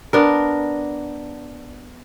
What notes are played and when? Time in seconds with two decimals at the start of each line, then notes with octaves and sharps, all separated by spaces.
0.13 B3 D4 A#4